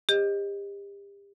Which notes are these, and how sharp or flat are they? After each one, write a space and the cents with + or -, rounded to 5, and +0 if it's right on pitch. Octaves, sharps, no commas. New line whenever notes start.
G4 +35 C5 +25 D#5 +0